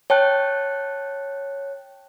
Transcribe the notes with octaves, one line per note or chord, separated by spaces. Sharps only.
C#5 G5 A5 F#6